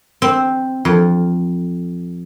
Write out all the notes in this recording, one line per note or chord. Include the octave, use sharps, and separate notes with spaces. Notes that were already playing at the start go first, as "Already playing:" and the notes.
C4
F2